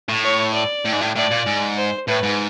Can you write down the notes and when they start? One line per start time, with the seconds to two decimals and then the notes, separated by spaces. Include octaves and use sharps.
0.09 A2
0.24 C#5
0.54 D5
0.85 A2
0.93 G#2
1.01 A2
1.16 A2 D5
1.31 A#2
1.46 G#2
1.77 C5
2.08 A2 B4
2.23 G#2